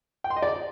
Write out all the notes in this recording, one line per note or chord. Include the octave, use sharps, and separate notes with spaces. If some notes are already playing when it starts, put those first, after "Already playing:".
G5
C6
D#5
D5